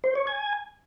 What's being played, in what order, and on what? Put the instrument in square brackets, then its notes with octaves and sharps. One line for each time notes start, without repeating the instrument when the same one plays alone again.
[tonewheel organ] C5
C#5
G#5